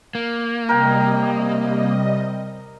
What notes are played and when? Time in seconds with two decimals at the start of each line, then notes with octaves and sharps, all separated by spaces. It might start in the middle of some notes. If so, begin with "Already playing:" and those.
0.15 A#3
0.69 C3 G3 A#4 D#5 G5